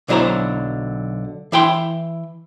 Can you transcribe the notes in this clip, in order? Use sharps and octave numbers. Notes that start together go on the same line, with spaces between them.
B1 D3 F#3 E4 C5 A#5
E3 E4 G5 C6